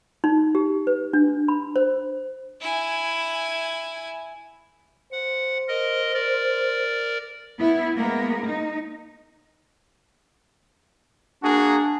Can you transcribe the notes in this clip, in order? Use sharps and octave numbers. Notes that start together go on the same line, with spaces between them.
D#4
G4
B4
D4
B5
C5
E4 G#5
C5 F#5
A#4 D#5
A#4 D5
B3 E4
G#3 A#3 B3 A#4
D#4
A#3 D4 F#4 G#4